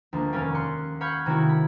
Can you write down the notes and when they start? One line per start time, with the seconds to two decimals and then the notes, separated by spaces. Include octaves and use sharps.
0.13 D2 F3 G#3 A#3 D4
0.33 F1 D#2 C#4 D5 F5 G#5
0.55 C6 F#6 C#7
1.01 F5 F#5 B5 C#6 G6 G#6
1.26 C3 D#3 A3 E4 F#4 G#6
1.49 B5